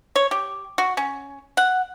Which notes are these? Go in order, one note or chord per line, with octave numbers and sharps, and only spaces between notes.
C#5
G4
F#4
C#4
F#5